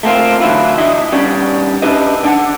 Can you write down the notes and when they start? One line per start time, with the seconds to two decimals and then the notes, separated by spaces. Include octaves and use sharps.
0.03 A3 A#3 C4 F4
0.40 D3 E3 F#3 A3 E4 F4
0.78 D4 E4 D#5
1.12 G3 B3 C#4 D4
1.82 C#4 D4 E4 G4 B4 D#5
2.23 D3 D4 F#5